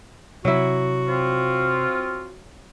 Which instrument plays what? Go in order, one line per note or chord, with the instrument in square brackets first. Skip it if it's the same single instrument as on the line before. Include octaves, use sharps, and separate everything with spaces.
[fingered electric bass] C3 [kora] F#3 E4 [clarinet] F#4
[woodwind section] C4 F4